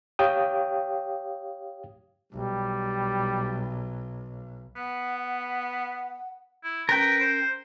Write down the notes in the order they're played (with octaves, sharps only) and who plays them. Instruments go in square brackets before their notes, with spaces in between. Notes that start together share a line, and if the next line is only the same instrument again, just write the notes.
[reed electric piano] G4 C#5 F5 G5 D#6
[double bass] B1 [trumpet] G3
[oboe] B3 [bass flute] F#5
[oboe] E4
[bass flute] C#4 [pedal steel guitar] A#4 G5 [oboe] B4
[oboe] C5